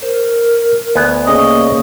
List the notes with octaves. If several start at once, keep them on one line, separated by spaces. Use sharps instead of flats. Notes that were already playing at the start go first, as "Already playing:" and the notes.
A#4 C5
D2 B3 G#5
C#3 A#3 C#4 D#5 D6